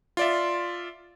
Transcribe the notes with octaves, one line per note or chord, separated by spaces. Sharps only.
F4 D5 E5